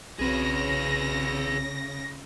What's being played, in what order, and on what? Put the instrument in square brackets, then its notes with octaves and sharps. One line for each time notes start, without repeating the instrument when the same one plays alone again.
[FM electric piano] B1 C4 F#4 [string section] C#3 A#6 [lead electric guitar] G#4 B4